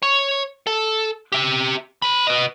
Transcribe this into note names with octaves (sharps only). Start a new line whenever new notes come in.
C#5
A4
G4 E5
C5 B5
B4 D#5